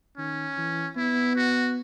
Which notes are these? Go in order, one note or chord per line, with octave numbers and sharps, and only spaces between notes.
D#3 C#4
E3
B3 E4
F#4